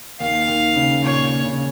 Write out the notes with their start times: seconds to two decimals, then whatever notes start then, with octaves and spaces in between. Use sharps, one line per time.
0.20 D#2 D#3 F5
0.48 D#2 D#3
0.76 C#3
1.03 A#2 C#5
1.24 A#2
1.44 C#3